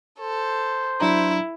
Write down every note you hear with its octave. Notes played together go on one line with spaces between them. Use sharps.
A4 C5
F#3 D4 E4 A#5